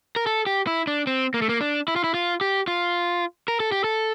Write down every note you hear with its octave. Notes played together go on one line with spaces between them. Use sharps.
A#4
A4
G4
E4
D4
C4
A#3
A3
A#3
D4
E4
F4
E4
F4
G4
F4
A#4
A4
G4
A4